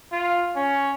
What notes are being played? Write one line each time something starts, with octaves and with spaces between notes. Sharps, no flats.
F4
C#4